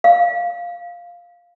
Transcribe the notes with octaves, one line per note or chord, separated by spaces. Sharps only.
F5